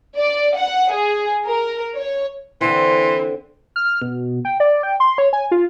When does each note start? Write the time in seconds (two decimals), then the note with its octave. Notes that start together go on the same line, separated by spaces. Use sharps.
0.18 D5
0.58 F#5
0.94 G#4
1.46 A#4
1.98 C#5
2.61 D3 E3 C4 C6
3.76 F6
4.02 B2
4.45 G5
4.60 D5
4.83 G5
5.00 C6
5.18 C#5
5.33 G#5
5.51 F4